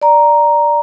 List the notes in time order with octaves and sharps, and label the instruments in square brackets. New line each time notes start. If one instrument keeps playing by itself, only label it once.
[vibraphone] D5 A#5